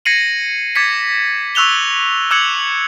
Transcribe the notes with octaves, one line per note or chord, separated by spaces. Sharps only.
G#6 A#6 C7 C#7 D#7 F#7
D6 G#6 A6 B6 C#7
C#6 E6 F#6 F7 G7
D6 E6 F#6 G#6 C#7 F#7